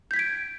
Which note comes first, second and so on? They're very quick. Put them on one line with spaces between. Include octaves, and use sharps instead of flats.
G6 B6 G#6 D7